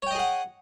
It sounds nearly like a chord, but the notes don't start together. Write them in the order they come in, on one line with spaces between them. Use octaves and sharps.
C#5 G5 D#5 G#4 F#5